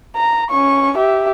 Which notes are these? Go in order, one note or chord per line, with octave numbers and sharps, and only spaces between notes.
A#5
C#4 C#6
G4 E5